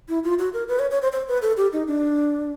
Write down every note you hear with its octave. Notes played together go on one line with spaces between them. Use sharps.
E4
F4
F#4
A#4
B4
C#5
C#5
C5
C5
B4
A4
G4
D#4
D4